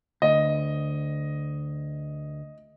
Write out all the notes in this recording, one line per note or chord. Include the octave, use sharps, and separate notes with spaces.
D2 D#5